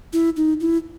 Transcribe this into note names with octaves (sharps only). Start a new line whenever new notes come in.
E4
D#4
E4